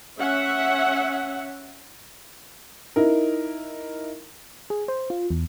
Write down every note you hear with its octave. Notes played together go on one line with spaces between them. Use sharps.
C#4 E5 F#5
D#4 E4 A#4
G#4
C5
F4
E2